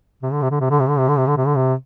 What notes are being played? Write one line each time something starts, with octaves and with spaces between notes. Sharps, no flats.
C3
D3
C3
D3
C3
D3
C3
D3
C3
D3
C3
D3
C3
D3
C3